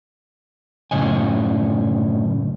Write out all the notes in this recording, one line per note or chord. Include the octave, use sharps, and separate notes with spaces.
F#2 A2 C#3 C#5 D#5 G#5